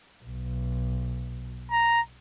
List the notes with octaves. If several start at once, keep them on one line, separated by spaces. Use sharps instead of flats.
B1
A#5